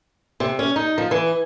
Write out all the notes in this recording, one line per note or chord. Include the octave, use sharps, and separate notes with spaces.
C3
C#4
D#4
F3
E3